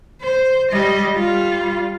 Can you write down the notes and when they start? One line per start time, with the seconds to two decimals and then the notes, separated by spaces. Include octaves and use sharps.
0.22 C5
0.71 G3 D#5
1.15 G3 F4